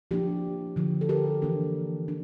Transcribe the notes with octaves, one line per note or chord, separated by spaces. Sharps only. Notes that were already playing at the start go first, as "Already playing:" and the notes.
F3 A#3 D4 E4 G4
D3 F3 A#3
A4
G4 A#4
E3 A#3 D4
D4